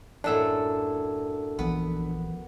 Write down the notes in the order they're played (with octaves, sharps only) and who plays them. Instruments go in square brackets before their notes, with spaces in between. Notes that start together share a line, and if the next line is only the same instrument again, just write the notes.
[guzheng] F#2 A2 A3 [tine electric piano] D4 E6
[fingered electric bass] A#1 E3 F3 [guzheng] B3 B4